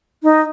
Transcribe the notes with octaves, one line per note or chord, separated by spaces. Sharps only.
D#4